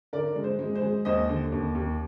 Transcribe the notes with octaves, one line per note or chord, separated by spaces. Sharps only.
D3 A#4 D5
G#3
C5
G#3
C5
G#3
D#2 C5 D#5
D3
D#2
D#2